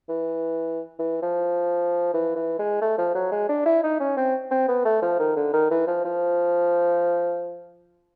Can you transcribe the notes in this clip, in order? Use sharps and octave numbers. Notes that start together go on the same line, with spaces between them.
E3
E3
F3
E3
E3
G#3
A3
F3
F#3
G#3
D4
E4
D#4
C#4
C4
C4
B3
A3
F3
D#3
D3
D#3
E3
F3
F3